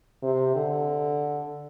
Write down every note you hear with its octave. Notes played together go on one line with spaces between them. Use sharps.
C3
D3